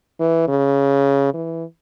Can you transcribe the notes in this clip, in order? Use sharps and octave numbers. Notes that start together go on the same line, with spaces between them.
E3
C#3
E3